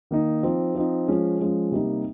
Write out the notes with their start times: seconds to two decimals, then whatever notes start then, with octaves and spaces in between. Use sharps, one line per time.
0.11 D#3 A#3 D#4
0.43 F3 C4 D#4
0.75 F3 C4 D#4
1.08 F3 G#3 C#4
1.40 F3 G#3 C#4
1.71 C3 G3 A#3 D#4